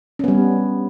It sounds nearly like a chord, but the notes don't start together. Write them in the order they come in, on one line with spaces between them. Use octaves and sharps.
C#4 B3 G3